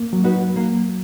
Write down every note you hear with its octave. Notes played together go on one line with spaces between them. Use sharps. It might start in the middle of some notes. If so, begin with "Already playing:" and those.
Already playing: A#3
F#3
D#4 F#4 B4
A#3